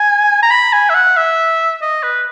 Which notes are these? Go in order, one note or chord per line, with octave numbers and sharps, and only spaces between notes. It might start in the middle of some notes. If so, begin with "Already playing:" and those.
Already playing: G#5
A#5
B5
G#5
E5
F#5
E5
D#5
B4